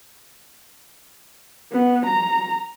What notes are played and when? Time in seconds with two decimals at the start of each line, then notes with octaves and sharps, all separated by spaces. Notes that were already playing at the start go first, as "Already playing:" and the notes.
1.72 B3
2.06 A#5